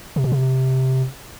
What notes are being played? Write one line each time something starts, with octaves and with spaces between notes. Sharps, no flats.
C3
B2
C3